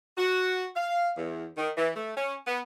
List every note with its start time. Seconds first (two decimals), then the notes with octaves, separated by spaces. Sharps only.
0.18 F#4
0.76 F5
1.17 E2
1.58 D#3
1.78 E3
1.96 A3
2.17 C#4
2.47 B3